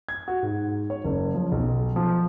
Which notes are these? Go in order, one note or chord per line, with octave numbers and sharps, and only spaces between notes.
G#6
F#4
G#2
C#5
F#1
F3
B1
F3